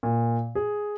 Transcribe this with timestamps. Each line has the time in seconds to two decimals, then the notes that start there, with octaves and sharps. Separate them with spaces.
0.03 A#2
0.55 G#4